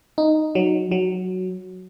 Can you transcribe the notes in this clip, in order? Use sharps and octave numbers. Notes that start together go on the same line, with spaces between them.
D#4
F#3
F#3